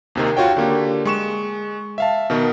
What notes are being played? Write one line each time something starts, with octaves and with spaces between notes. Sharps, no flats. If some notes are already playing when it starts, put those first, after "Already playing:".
D#2 C3 D#3
F4 F#4 C#5 G5
D3 A#3 G4
G#3 C#6 E7
E5 F5 A5
B2 D#3 B3